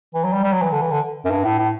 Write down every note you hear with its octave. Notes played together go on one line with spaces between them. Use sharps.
E3
F#3
G3
G3
F#3
E3
D3
E3
D3
F#2
G2
A2
A2